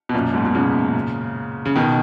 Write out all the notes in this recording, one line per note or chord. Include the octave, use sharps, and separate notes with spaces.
B2
F#2 A#2
G#2 B2
B2
A#2 C#3
C#3
B2 D#3